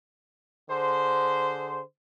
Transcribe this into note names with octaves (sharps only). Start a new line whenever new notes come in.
D3 G#4 C5